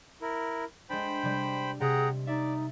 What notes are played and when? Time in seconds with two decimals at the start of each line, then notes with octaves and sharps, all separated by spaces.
0.22 E4 A#4
0.90 G#3 D4 C5 G5 B5
1.22 C3 G3
1.81 C3 G#4 F#5 G5 A#5
2.27 D#4 D5 E5 A6